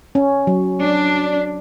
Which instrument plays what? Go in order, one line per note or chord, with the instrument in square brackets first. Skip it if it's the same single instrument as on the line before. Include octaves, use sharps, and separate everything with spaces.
[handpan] C#4
F#3
[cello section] D4